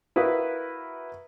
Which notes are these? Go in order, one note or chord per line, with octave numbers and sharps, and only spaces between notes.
E4 F#4 A#4 B4 F5 D#6